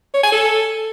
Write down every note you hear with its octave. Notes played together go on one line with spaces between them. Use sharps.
C#5
G#5
A4